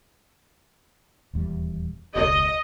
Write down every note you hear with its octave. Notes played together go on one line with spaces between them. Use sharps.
D#1 E2 G3
E1 C#2 D#5